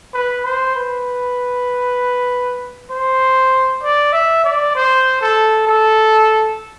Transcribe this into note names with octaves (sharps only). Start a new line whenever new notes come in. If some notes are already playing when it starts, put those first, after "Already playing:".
B4
C5
B4
C5
D5
E5
D5
C5
A4
A4